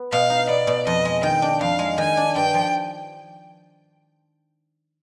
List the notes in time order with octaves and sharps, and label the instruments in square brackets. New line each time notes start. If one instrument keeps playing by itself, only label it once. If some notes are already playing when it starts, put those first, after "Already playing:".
Already playing: [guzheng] B3
[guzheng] B2 [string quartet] F5
[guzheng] D#4
[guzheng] B3 [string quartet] D5
[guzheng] B2
[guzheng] F2 [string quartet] D#5
[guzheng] G#3
[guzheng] D#3 [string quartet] G5
[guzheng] D4
[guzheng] F2 [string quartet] F5
[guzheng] G#3
[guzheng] D#3 [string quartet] G#5
[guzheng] D4
[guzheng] G2 [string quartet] G5
[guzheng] F3